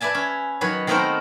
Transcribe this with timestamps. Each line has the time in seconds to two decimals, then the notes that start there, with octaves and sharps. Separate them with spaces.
0.01 B4 D5 E5 G#5 A5
0.15 C#4
0.61 D#3 F#3 B4 C#5
0.87 D#3 A3 B3 C4 A#4 C5